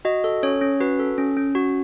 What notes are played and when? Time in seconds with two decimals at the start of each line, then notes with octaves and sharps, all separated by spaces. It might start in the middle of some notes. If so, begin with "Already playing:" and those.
0.05 F#4 D#5
0.24 A4
0.43 C#4 C#5
0.61 C#4
0.80 F#4 B4
0.99 A4
1.18 C#4
1.37 C#4
1.55 F#4